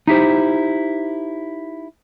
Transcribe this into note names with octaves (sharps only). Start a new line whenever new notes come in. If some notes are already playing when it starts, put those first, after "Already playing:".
D#4 E4 G4 C5